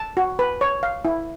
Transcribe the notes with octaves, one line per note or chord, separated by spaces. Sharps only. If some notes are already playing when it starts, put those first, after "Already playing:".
Already playing: A5
F#4
B4
C#5
F5
E4